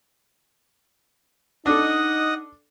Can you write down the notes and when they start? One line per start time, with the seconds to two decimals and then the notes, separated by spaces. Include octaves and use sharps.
1.66 D4 D#4 A4 D#5 F#5 D#6